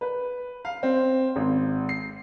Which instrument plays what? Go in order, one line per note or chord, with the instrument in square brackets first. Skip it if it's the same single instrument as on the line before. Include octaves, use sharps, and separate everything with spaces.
[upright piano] B4
F5
C4
G#1
C7